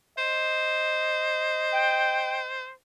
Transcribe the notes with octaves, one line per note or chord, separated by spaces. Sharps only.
C5 D#5
G5